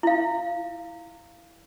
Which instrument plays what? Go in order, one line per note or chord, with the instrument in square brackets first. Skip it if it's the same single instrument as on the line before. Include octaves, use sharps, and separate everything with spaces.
[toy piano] E4 F5